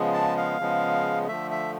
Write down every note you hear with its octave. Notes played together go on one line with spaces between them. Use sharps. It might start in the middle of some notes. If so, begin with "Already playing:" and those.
Already playing: C#3 F3 G#3 B3
A5
F5
C#3 F3 G#3 B3
D3 F3 A3 E5
E5